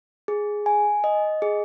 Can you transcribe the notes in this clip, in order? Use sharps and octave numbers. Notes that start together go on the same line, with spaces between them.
G#4
G#5
D#5
G#4